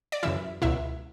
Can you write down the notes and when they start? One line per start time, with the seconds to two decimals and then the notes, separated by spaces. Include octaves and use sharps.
0.12 D5
0.23 F#2 C#3 E3 E4 E5
0.62 C#2 B2 E4 E5